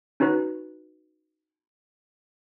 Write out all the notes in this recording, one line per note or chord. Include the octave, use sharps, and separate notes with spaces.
C#4 D#4 F#4 B4